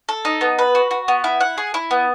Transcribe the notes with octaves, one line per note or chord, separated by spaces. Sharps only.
A4
D#4
B3
B4
F#4
F#4
B3
E4
F#5
G#4
E4
B3